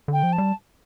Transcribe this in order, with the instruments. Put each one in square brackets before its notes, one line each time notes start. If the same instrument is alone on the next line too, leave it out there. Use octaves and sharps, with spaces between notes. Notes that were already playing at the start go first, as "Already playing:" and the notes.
[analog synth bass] D3 [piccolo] G5
[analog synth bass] F3
[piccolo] A5
[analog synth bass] G3